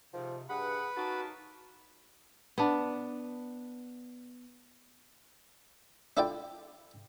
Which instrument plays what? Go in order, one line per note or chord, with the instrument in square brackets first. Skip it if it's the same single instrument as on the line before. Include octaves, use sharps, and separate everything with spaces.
[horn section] G#2 D#3 [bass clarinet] C3 [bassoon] F3
[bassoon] G2 [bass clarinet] G#4 [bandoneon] B4 B5 [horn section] F#5
[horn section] A#3 C#4 A5 [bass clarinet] D#4 [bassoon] F#4
[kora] B3 D4
[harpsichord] D4 E4 F4 A4 D5 G5